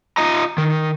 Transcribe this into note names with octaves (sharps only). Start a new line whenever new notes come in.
F4 D#5 A#5
D#3